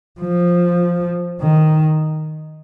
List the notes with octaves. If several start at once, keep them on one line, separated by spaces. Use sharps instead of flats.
F3
D#3